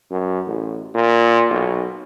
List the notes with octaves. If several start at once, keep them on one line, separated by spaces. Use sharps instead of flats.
F#2
A1
A#2
B1